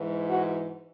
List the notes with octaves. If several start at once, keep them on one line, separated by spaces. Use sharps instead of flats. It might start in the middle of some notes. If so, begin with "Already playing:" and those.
Already playing: G#2 E3
F#4